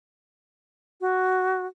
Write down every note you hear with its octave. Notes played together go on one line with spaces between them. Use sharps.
F#4